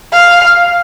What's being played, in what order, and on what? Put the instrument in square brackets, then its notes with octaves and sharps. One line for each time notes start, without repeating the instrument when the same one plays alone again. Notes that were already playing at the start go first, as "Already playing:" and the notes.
[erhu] F5